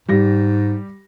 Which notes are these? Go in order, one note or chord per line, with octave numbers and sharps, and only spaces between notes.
G#2 G3 G4 A#6